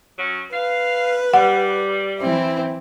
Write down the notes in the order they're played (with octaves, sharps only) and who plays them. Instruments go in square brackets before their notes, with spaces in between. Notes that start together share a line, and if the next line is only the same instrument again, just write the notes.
[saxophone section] F#3 C#4 F#4
[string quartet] B4 [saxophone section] F5
[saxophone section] G3 [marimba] F#5
[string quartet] E3 C4 E4